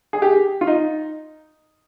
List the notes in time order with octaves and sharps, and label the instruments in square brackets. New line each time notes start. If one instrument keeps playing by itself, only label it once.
[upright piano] G#4
G4
F4
D#4